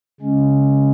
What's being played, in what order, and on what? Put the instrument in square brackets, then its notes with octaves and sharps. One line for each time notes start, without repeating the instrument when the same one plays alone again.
[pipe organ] C#3 G#3 C#4